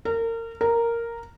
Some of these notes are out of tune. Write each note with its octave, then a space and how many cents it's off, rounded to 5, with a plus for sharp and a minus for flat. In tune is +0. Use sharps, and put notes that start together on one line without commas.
A#4 -30
A#4 -5